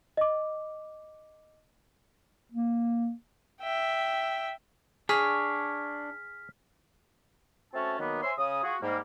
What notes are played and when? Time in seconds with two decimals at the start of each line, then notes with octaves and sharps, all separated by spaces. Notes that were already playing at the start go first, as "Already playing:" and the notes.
0.17 D#5 D6
2.52 A#3
3.62 E5 G5
5.09 D4 G#4 C#5 F6 B6
7.74 A3 C4 C#4 F#4 A5
7.99 D#3 F#3 A#3 B3
8.23 C5 C#5 E5 G#5 C6
8.38 C#3 D#6
8.63 F4 F#4 G#4
8.82 G#2 G3 A#3